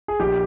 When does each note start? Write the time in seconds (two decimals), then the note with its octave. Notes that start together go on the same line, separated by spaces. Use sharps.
0.08 G#4
0.20 A#1 G4